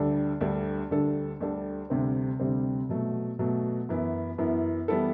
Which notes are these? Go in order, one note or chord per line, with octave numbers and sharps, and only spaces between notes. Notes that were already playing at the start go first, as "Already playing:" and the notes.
Already playing: D2 D3 G3 D4 A4
D2 D3 G3 D4 A4
D2 D3 G3 D4 A4
D2 D3 G3 D4 A4
D2 C3 G3 C4
D2 C3 G3 C4
B2 F#3 A3
B2 F#3 A3
F#2 E3 B3 E4
F#2 E3 B3 E4
E3 G3 B3 E4 A4